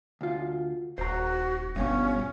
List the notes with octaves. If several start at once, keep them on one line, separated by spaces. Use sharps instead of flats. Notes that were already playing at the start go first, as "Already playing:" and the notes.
D2 F4
D#1 F#4 C5 A#5
G1 G2 B2 C#4